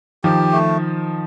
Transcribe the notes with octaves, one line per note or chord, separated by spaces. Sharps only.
D#3 F3 G4
A3